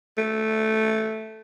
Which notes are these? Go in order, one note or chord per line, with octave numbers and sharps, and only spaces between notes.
A3